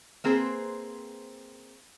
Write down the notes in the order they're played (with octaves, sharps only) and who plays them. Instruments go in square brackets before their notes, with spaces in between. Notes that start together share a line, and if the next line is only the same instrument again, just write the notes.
[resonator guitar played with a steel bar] A#3 C4 G#4 B4 C5